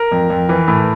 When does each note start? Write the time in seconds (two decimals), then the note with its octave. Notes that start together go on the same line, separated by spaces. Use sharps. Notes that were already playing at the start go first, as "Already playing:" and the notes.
Already playing: A#4
0.12 F2
0.30 F2
0.49 E3
0.68 A2